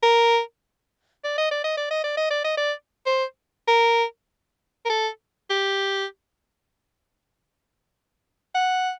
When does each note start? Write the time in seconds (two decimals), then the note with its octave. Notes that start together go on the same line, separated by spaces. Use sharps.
0.03 A#4
1.24 D5
1.38 D#5
1.51 D5
1.64 D#5
1.77 D5
1.90 D#5
2.03 D5
2.17 D#5
2.30 D5
2.44 D#5
2.57 D5
3.06 C5
3.67 A#4
4.85 A#4
4.90 A4
5.50 G4
8.55 F#5